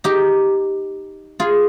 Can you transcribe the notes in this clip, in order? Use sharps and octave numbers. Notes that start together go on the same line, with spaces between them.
D#4 G4
F4 G#4